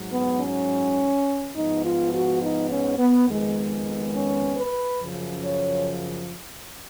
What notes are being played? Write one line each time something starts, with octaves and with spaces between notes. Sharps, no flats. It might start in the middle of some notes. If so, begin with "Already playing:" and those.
Already playing: G#2 F#3
B3
C#4
G#2 F3 B3 D#4
F4
F#4
D#4
C#4
B3
F2 D#3 G#3 B3
C#4
B4
F#2 C#3 F3
C#5